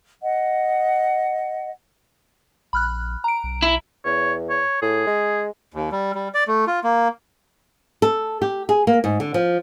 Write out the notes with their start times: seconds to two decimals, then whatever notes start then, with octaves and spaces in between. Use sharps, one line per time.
0.22 D#5 F#5
2.73 A#1 B5 F6 F#6
3.24 A#5 D7
3.43 B1
3.62 E4
4.05 E2 C#5
4.50 C#5
4.82 A2 G#4
5.07 G#3
5.74 D#2
5.92 G3
6.15 G3
6.34 D5
6.48 A3
6.67 F4
6.84 A#3
8.02 A4
8.42 G4
8.69 G#4
8.87 A#3
9.04 G#2
9.20 D3
9.34 F3